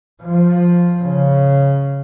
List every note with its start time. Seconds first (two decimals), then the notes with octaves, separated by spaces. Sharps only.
0.23 F3
1.02 C#3